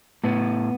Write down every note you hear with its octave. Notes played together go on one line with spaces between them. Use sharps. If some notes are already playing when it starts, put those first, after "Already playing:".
A2 B3